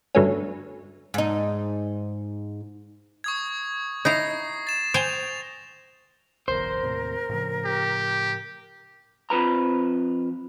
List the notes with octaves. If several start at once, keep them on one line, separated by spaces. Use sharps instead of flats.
G2 D3 F#3 A3 B3 C#4
G#2 D#4
C#6 D#6 G#6
D#4 E4 A#5 A#6 C7
A6 E7
C5 G5 G#5 F7
F#1 B1 E2 A#4 C5
D#2 A2 C3
A2 C#3 F3
G4
F2 F3 B4 A#5